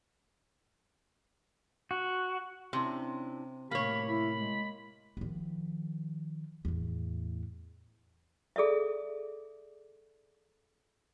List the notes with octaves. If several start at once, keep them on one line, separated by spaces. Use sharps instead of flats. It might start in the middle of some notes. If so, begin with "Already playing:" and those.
F#4
C3 C#4 D4 E4
A2 C3 A#3 G4 C#5 B5
E4 B5
G#3
D#3 F3
E2 A2
G#4 A4 D5 E5